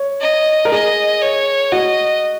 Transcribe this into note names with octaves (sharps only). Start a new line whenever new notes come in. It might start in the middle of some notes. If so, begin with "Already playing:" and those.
Already playing: C#5
D#5
A#4
G#4 D#5
C#5
F#4 D#5